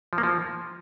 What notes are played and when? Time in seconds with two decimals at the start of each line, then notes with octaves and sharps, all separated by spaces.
0.13 F3
0.18 A#3
0.23 F3